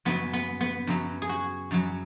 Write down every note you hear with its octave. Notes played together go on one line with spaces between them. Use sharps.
F#2 C#3 F#3 B3
B3
B3
F#2 C#3 F#3
G#4
F#4
F#2 C#3 F#3